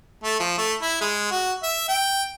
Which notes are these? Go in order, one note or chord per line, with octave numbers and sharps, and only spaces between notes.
A3
F3
A3
E4
G#3
F#4
E5
G5